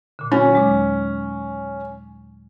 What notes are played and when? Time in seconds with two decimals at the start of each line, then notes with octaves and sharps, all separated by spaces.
0.19 A#2 D3
0.32 F#3 C#4
0.53 D#2 G#3 D6